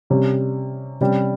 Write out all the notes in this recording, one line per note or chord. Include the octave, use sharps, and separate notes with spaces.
C3 G3 C#4 G4
C3 G3 C#4 G4